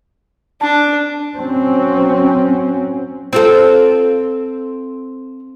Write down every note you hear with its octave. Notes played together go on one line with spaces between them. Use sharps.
D4 A5
F#3 C4 C#4
C4 F4 A4